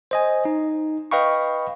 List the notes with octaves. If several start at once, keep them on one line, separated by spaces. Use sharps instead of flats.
C5 D#5 G#5
D#4
B4 D#5 F5 G5 B5 C#6